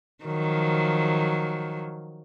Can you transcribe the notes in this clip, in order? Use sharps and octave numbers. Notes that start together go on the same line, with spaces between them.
D#3 F3 F#3